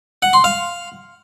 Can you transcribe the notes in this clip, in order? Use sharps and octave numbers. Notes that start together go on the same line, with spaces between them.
F#5
C6
F5